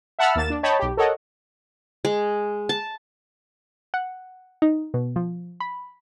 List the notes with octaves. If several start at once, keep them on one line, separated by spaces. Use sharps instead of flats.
E5 F#5 A5 B5 E6 F6
D#2 A#3 A6 E7
D4
C#5 D#5 G5 A5 B5
B1 G4
A4 A#4 C#5 D#5 F#5
G#3
A5
F#5
D#4
B2
F3
B5